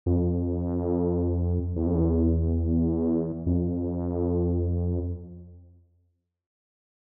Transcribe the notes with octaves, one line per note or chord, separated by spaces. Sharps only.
F2
E2
F2
E2
F2